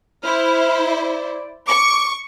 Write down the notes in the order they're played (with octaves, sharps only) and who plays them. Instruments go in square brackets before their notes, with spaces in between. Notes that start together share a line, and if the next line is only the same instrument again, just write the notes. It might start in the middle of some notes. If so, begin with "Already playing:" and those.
[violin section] E4 C5 [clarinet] F6
[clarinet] D5
[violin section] C#6 [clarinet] D6